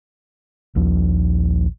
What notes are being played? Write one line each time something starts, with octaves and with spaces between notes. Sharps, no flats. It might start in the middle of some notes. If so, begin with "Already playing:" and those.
A#1 D#2 F3